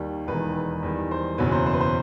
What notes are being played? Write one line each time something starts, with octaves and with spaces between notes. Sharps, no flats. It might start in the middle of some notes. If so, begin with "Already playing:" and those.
Already playing: D#2 D#3 G3
E1 E2 D#3 B4
B4
E2 D#3 G3
C5
F#1 E2 B2 F#3 B4
C5
C5
B4
C5